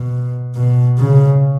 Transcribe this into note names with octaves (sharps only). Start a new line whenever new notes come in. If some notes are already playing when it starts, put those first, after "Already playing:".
Already playing: B2
B2
C#3